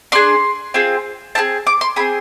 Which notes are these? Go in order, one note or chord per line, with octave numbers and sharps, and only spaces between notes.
D4 G#4 C6
C4 F4 G#4
C4 E4 G#4 A5
D6
C6
C4 G#4 B5